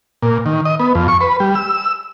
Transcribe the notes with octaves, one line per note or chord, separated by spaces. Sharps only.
A#2
D#3
D#5
B3
F2
C#6
B4
G3
E6